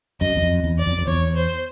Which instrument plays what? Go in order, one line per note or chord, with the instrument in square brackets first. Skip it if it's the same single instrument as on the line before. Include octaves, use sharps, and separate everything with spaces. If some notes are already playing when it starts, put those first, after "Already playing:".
[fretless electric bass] F#2 [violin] D#5
[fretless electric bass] E2
F2
E2
[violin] D5
[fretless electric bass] F2
F2
[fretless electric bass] E2 [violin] C#5
[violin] C5